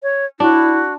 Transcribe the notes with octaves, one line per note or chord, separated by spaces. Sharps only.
C#5
D4 E4 F#4